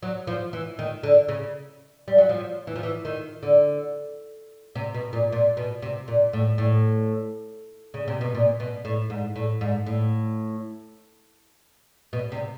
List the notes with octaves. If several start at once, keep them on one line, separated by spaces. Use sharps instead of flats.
F#3
F3
E3
D#3
D3
C#3
G3
F#3
F3
E3
F3
E3
D#3
D3
C3
B2
A#2
A#2
B2
C3
A#2
A2
A2
C#3
C3
B2
A#2
B2
A2
G#2
A2
G#2
A2
B2
C3